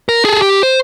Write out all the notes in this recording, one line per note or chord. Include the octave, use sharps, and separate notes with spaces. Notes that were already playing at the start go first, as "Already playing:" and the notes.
A#4
G#4 A4
G4
C5